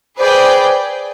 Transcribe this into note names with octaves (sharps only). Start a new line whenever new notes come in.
G#4 B4 C5 D5 G5